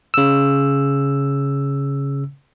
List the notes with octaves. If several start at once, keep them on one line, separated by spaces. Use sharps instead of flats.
C#3 E6